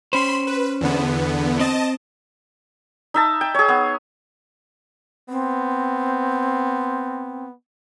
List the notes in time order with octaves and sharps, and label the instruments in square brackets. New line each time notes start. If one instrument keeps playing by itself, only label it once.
[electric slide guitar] C#4 C5 [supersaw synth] B5 C6
[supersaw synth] B4
E2 D3 B3
[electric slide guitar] C4 [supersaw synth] D#5 A5
[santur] D#4 E5 A5
G5
G#4 C#5
B3
[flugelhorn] B3 [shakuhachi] C4